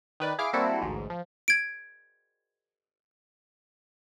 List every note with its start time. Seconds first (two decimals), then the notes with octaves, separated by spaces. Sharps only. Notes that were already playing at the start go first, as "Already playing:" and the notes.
0.20 D#3 B4 D5
0.39 E4 G#4 F5 D6 F6 D7
0.53 G3 A#3 C4 E4 F#4 A4
0.82 A1 D2 G#2
1.10 F3
1.48 G#6 D7